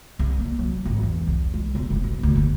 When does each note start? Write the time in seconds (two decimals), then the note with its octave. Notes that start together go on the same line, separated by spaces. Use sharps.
0.19 C2
0.40 A#3
0.59 F#3
0.85 G#1
1.03 E2
1.27 C2
1.54 G#3
1.75 E1
1.90 F1
2.04 B1
2.23 D2
2.35 F#1